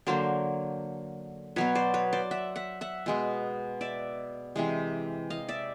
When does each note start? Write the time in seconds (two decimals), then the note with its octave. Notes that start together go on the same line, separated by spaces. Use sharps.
0.07 D3 F#3 A#3 A#4 C5
1.56 B2 F#3 B3 B4 C#5
1.75 C5 D5
1.94 B4 C#5
2.13 C5 D5
2.31 E5 F#5
2.56 E5 F#5
2.81 E5 F#5
3.06 B2 G#3 B3
3.81 D5 E5
4.56 C3 E3 G#3
5.30 D#5 F5
5.48 D5 E5